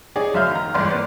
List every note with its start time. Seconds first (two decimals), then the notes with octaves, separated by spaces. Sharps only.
0.16 D#4 G#4 C#5 D5
0.34 F#1 F#2 E5 F5 F6 G6
0.51 D#3 A#5
0.74 G1 G#2 E3 D5 C6
0.91 A#3 B4 D5